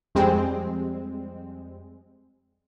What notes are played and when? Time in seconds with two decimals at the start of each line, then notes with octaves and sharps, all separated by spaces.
0.15 F2 G3 G#3 C4